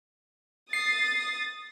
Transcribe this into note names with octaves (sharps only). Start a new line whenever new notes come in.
D#6 A6 C7